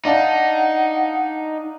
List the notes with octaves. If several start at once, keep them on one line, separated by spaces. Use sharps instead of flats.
D4 D#4 F5 F#5 A5